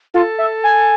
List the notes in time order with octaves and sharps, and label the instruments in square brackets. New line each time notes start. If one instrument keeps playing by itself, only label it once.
[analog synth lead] F4 [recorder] A4
[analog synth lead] E5
G#5